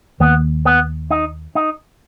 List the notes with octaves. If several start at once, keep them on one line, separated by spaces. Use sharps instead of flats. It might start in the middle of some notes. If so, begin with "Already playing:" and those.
D#2 D#3 A#3 B3
B3
D#4
D#4